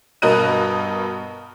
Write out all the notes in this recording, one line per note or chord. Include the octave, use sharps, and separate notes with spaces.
G2 B2 A#4 D#5 F#6 D#7